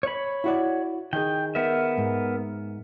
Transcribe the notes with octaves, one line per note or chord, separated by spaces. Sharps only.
C#5 B5
E4 F#4 D5
D#3 G#4 G5
B3 A#4 E5
G#2